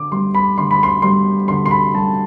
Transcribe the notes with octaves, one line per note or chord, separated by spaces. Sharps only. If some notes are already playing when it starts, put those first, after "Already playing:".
Already playing: D3 D6
G3 C6
B5
D3 C6
B5
C6
G3 C6
D3 C6
C6
B5
G3 A5